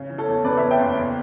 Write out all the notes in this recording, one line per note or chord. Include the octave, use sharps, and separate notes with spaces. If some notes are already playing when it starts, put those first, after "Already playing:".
Already playing: C#3
E3
A4 C#5
E2
C#3 B4 D5
C#5 E5
E2
E5 G5
F#1
E2